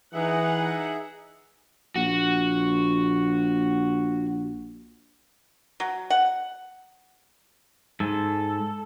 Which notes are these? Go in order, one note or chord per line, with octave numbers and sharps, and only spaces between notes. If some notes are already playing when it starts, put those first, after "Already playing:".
E3 D#4 G#4 E5 F#5
A#1 F#4
F#3
F#5
G#2 A4